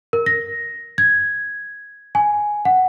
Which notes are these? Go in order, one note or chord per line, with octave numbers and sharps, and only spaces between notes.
A#4
A#6
G#6
G#5
F#5